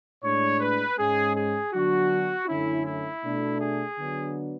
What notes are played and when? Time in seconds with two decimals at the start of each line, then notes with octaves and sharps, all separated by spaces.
0.23 A2 G#3 D4 C#5
0.60 B4
0.98 G#2 G#3 C#4 G#4
1.36 G#4
1.73 D3 F#3 B3 D4 F#4
2.48 F#2 D3 A3 C#4 E4
2.86 E4
3.24 B2 A3 D4
3.61 G#4
3.98 D3 F#3 B3 D4